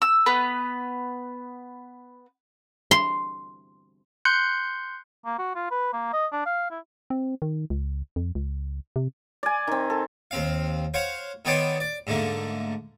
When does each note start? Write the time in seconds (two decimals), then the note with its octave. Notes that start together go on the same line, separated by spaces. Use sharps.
0.02 E6
0.26 B3 B4
2.91 C6
4.25 C6 F#6 G6 C#7
5.25 A#3
5.39 F#4
5.55 F4
5.71 B4
5.93 A#3
6.13 D#5
6.32 D4
6.46 F5
6.71 E4
7.10 C4
7.42 D#3
7.70 C#2
8.16 F2
8.35 C#2
8.96 C3
9.43 D5 G#5
9.67 D#3 C4
9.90 A4
10.31 D#2 C4 F5
10.94 C5 C#5 F5 F#5
11.45 D#3 B3 C#5 D5 G5 C6
11.80 D5
12.07 G#2 D3 A3 A#3